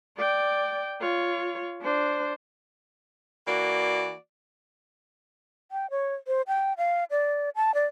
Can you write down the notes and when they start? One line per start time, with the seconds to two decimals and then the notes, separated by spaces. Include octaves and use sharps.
0.17 D5 G5
1.01 F4 C#5
1.82 D4 C5
3.47 E3 A#3 F#4 D5
5.72 G5
5.91 C#5
6.27 C5
6.47 G5
6.78 F5
7.11 D5
7.56 A5
7.74 D5